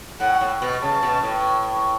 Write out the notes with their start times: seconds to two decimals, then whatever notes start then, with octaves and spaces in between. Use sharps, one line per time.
0.20 A2 F#5
0.41 A2
0.62 B2
0.82 C#3 A5
1.03 B2
1.23 A2